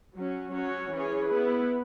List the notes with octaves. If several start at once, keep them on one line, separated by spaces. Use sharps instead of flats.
F#3 C#4 F#4
F#3 C#4 F#4 C#5
E3 C#4 G#4 C#5
B3 E4 B4